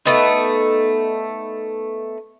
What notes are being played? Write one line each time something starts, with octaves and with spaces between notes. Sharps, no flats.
A3 B3 D#4